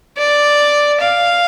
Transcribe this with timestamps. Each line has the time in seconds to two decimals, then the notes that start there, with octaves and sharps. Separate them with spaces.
0.18 D5
1.00 F5